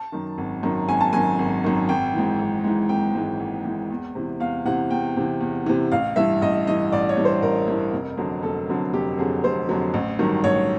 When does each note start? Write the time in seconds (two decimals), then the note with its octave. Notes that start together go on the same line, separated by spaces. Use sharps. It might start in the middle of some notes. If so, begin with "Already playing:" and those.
Already playing: A5
0.12 F#2 D#3
0.38 G#1
0.63 F#2 D#3
0.89 G#1 G#5
1.01 A5
1.13 F#2 D#3 G#5
1.39 G#1
1.64 F#2 D#3
1.89 G#1 G5
2.14 G#2 E3
2.39 G#1
2.64 G#2 E3
2.89 G#1 G5
3.15 G#2 E3
3.40 G#1
3.65 G#2 E3
3.90 E2
4.15 C3 E3
4.40 E2 F5
4.65 C3 E3 F#5
4.90 E2 G5
5.17 C3 E3
5.41 E2
5.66 C3 E3
5.92 A1 F5
6.16 G2 E3 E5
6.42 A1 D#5
6.67 G2 E3 D#5
6.92 A1 D5
7.09 C#5
7.17 G2 E3
7.25 C5
7.42 A1 A#4
7.68 G2 E3
7.93 F1
8.17 F2 D3 F#3
8.43 F1 A4
8.69 F2 D3 F#3
8.93 F1 G4
9.18 F2 D3 F#3 G#4
9.44 F1 C5
9.69 F2 D3 F#3
9.94 A1
10.19 G2 D#3 F#3
10.44 A1 C#5